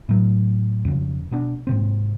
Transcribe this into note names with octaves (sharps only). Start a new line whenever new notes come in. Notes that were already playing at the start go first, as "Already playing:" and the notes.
A2 F#3
F2 C#3
B2 B3 D4
G#2 C3 C4